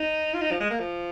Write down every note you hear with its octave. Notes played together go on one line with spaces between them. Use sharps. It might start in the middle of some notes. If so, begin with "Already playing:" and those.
Already playing: D#4
F4
D#4
F3
G#3
A#3
F3